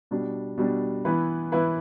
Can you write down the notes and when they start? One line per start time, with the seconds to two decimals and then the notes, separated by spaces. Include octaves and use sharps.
0.11 B2 G3 D4
0.58 B2 G3 D4
1.05 E3 B3 E4 B4
1.52 E3 B3 E4 B4